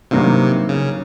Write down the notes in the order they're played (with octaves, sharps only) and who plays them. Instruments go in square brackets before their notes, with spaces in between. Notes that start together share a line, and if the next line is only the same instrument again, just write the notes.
[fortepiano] G2 D#3 F#3 A#3 [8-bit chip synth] C3
[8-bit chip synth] C#3